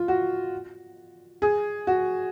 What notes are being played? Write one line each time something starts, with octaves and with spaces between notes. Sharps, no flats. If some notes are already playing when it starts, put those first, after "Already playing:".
Already playing: F4
F#4
G#4
F#4